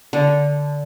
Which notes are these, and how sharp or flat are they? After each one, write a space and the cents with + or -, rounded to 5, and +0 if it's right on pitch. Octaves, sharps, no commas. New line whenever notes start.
D3 -15 A4 +0